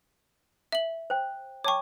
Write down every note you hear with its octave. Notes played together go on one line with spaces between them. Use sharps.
E5 F#7
C5 G5
C#5 G5 A5 C#6 D6